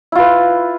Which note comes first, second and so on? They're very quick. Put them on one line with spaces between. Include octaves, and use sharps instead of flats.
E4 F4 B4